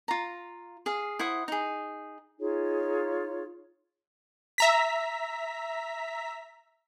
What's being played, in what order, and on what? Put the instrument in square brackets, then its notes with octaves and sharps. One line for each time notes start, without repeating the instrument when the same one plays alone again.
[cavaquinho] F4 A#5
G#4 F5
E4 C5 F#5 D#6
D#4 G#4
[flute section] D#4 F4 G#4 C#5
[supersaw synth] E5 A#5 B6